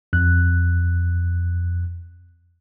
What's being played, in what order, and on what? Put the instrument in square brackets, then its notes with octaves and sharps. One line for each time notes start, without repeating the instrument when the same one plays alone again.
[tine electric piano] F2 F#6